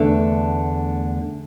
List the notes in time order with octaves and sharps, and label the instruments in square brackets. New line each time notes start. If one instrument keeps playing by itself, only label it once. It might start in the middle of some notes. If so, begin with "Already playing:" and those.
Already playing: [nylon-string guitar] E2 D3 A3 D4 A4